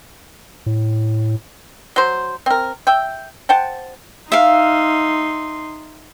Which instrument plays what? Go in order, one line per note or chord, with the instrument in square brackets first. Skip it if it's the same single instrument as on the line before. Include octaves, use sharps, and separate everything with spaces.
[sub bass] A2
[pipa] F#3 C5
C4 A#4
E5 G5
C5 F#5 G5 A5
[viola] D#4 C6 [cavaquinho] E5 F5